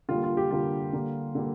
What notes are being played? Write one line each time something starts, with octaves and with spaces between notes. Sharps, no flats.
D3 G3 A#3 F4
F4
G4
D3 G3 A#3 F4
D3 G3 A#3
D3 G3 A#3